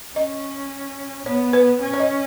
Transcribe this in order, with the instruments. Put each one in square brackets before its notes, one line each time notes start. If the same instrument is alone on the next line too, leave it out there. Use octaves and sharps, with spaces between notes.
[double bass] C#4 [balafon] D#5
[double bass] B3 [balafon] C#5
[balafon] B4
[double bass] C#4
[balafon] C#5
D#5